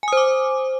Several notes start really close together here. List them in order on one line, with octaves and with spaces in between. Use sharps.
G#5 D#6 C5 D6